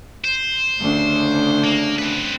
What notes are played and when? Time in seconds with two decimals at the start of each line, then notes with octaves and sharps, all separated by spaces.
0.24 C5
0.78 D2 C#3 D4
1.64 A#3
1.99 C4 B4